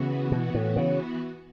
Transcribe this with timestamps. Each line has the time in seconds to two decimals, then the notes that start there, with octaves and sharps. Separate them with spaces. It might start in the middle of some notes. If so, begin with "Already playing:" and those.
Already playing: C#3 E3 B3 F#4
0.32 B2
0.54 A2
0.76 C#3